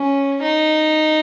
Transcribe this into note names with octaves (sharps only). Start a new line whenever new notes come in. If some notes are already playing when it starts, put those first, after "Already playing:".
Already playing: C#4
D#4